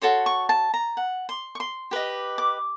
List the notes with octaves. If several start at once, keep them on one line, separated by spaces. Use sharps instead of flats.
F#4 A4 C#5 C6
C#6
A5
A#5
F#5
C6
C#6
C6
G4 B4 D#5
D6